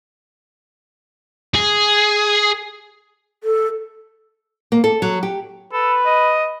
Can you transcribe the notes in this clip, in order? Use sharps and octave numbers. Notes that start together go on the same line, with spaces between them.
G#4
A4
A#3
A4
F#3
G4
A4 B4
D#5